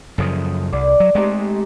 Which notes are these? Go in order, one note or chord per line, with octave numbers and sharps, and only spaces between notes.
F#2 C#3 F3 A4 D#6
C2 D5
F#3
G#3 A3 C4 D#4 G4